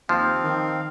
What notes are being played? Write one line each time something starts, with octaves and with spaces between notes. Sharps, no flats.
D#2 F3 C4 F5
D#3